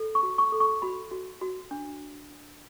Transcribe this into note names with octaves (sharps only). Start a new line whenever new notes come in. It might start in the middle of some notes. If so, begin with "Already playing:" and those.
Already playing: A4
C#6
F#4
C#6
A4
C#6
F#4 B5
F#4
F#4
D4